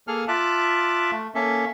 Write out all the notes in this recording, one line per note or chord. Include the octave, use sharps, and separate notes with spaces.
A#3 G#4 A4 F6
F4 E5 A5 D6 F#6
A3
A#3 C#4 A4 E5